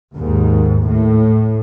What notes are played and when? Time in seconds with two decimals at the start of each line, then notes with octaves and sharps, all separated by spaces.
0.14 D#2 G#2
0.86 A2